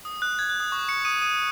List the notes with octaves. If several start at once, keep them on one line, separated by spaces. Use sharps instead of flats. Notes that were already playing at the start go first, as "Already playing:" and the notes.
D#6
F#6
G#6
F#6
D#6
C#6
C#6 C#7
D#6 D#7
D#6 D#7